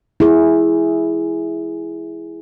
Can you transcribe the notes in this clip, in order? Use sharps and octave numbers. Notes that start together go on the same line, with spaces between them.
E4 G#4